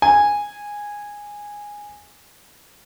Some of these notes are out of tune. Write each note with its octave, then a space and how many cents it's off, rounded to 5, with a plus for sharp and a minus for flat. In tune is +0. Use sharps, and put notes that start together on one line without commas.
G#5 -10